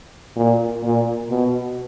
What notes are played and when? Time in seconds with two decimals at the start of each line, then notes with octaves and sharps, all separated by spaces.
0.36 A#2
0.83 A#2
1.30 B2